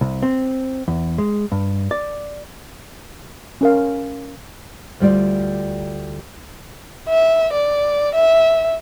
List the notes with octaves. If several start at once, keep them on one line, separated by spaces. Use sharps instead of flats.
C2
C4
E2
G#3
G2
D5
C#4 A#4 F5
D2 G3 F4 D5
E5
D5
E5